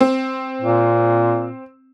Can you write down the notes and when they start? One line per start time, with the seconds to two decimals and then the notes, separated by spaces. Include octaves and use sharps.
0.01 C4
0.62 A#2